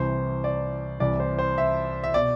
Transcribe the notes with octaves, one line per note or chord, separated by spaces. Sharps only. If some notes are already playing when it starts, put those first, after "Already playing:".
Already playing: C2 C3 E3 C5
D5
C2 C3 E3 D5
C5
C5
E5
E5
B2 D5